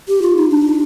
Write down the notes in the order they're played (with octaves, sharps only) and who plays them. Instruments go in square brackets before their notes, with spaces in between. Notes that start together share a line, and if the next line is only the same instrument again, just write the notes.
[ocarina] G4
F4
D#4
D4